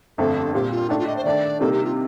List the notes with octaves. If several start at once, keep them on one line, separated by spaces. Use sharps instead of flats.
G1 F2 D3 A3 C4 A4
A#2 G3 C4 G4
F4
A2 A3 D4 D#4
F4
D#5
C5
D#3 A3 D4 D5
C3 G3 A#3 D#4 A4
G4
F4